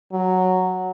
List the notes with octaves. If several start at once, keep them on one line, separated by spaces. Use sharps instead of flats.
F#3